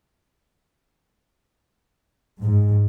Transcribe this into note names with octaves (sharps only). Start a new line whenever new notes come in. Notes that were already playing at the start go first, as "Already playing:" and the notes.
G#2